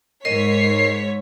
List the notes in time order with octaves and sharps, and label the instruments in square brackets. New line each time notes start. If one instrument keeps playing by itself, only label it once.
[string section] G#2 C#5 B6 [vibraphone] A#4 D#5 [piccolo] C7